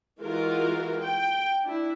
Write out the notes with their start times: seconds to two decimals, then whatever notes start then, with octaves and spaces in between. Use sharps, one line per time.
0.20 E3 G#3 F4 F#4 A#4
1.01 G5
1.63 D4 E4